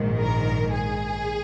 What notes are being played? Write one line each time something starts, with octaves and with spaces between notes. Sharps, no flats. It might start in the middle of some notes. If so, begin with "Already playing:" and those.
Already playing: A#1 G#2 D#3
A#4
G#4